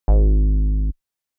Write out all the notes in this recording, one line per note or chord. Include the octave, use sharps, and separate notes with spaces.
G#1